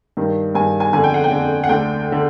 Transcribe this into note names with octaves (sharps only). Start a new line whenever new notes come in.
G2 D#3
G2 D#3 G#5
G#5
F2 D3 G#5
G5
F#5
G5
F2 D3
F#5
D2 D3 G5
D3